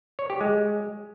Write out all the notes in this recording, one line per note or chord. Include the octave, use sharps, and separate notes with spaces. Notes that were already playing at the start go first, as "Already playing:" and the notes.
C#5
G4
G#3